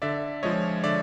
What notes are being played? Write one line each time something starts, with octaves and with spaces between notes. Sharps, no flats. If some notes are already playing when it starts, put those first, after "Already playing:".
D3 D5 E5
F3 G#3 C#5 D#5
D3 D5 E5